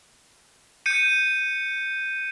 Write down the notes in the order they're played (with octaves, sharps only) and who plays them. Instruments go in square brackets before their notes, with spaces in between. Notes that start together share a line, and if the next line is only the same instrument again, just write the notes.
[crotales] G6 C#7 D#7